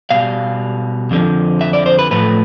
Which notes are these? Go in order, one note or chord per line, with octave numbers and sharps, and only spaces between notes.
B2 G3 F5
F2 D3 F3
E5
D5
C5
B4
A2 F3 A3 B4